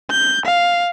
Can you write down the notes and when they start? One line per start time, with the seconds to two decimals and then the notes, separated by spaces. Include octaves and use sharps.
0.11 G6
0.46 F5